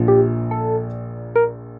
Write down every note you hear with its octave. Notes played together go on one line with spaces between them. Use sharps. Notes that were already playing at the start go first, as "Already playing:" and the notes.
Already playing: A#1 A#2 F3
G4
A4
A#4